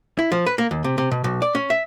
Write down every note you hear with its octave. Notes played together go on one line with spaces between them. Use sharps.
E4
F3
B4
A#3
D#2
C3
C3
B2
B1
D5
C#4
E5